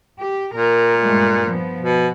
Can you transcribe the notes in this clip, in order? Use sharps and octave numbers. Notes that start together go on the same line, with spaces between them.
G4
A#2 A#4
G2 G#3 A3
F3 B3
B2